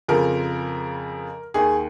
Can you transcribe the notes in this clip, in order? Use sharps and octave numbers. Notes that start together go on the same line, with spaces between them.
F2 C#3 F3 A#4
D#2 D#3 G#4